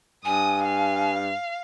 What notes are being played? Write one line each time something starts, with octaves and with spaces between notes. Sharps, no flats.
G2 G#5 D#6
F5